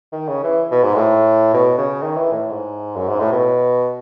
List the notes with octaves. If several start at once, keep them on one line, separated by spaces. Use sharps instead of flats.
D#3
C#3
E3
B2
G#2
A2
B2
C#3
D#3
E3
A2
G#2
F#2
G#2
A2
B2